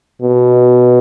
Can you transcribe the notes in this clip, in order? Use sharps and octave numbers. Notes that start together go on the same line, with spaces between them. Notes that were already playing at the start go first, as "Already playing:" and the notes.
B2